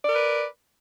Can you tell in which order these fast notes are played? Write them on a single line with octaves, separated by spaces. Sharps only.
D5 A#4 B4